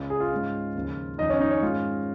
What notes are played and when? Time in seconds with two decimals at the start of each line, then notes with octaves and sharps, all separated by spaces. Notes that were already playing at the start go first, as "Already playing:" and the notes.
Already playing: C#2 C#3 G#3
0.10 G#4
0.20 F4
0.32 G#2 G#3 C#4
0.75 D#2 C#3 F3
1.18 F2 D#3 C#4 D#4 D#5
1.29 C#4 C#5
1.40 D#4 D#5
1.51 C#4 C#5
1.62 G#2 G#3 C#4 F4